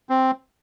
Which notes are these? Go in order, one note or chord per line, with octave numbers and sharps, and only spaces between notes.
C4